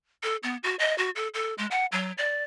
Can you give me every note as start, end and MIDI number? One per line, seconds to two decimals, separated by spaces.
0.23 0.36 69
0.43 0.57 59
0.64 0.75 66
0.79 0.96 75
0.98 1.10 66
1.16 1.28 69
1.34 1.54 69
1.58 1.66 56
1.71 1.86 78
1.92 2.12 54
2.18 2.44 74